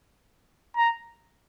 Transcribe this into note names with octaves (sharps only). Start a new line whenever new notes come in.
A#5